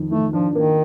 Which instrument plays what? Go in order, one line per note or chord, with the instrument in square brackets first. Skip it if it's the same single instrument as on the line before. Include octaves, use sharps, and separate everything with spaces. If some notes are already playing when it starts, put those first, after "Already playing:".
Already playing: [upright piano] F2 D#3
[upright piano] D#3 [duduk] A3
[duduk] F3 [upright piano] D4
[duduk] D#3 [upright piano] A#3